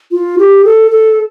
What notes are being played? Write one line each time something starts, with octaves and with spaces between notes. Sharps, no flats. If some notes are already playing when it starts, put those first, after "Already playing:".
F4
G4
A4
A4